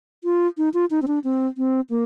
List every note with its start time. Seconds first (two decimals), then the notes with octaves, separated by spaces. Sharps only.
0.24 F4
0.58 D#4
0.74 F4
0.91 D#4
1.02 C4
1.07 D4
1.24 C4
1.57 C4
1.90 A#3